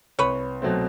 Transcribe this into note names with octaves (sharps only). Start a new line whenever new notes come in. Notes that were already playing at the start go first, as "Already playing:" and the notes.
C2 B4 C#5
B2 F#3 A3 C4